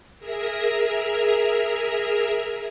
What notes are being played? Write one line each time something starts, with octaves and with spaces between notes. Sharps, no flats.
G#4 A#4 E5 A#5